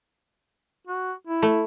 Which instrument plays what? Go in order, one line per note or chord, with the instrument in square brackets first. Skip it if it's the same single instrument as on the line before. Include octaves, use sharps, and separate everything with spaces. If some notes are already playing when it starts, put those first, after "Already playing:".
[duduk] F#4
E4
[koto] A3